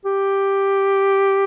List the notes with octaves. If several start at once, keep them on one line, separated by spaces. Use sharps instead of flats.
G4